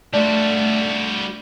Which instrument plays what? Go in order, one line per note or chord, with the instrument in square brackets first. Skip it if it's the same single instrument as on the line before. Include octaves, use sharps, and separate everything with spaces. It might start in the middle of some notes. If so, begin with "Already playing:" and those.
[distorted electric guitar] G3 F#4 [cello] A3 [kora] D4 F4